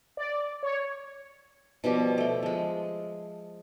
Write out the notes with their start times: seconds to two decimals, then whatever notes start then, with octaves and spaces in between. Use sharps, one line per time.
0.17 D5
0.63 C#5
1.84 B2 F3 G3 G4
2.18 A3 G5
2.43 F3 G#3